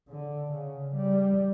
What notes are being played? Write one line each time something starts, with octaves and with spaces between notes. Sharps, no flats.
D3
C#3
G3